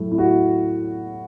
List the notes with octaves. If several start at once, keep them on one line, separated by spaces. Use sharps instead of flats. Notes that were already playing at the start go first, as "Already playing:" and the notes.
Already playing: A2 F#3 A3 E4
E4
F#4